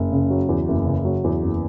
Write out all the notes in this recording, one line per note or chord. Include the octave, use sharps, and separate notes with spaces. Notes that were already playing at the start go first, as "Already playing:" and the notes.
Already playing: F#1
C#3
F#3
E2
F#1
C#3
F#3
E2
F#1